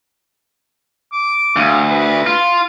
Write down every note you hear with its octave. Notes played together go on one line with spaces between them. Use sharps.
D6
D2 F5
B4
F4